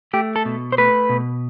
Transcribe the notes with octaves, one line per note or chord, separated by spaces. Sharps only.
A3 G4
A4
B2
C5
A3 B4
B2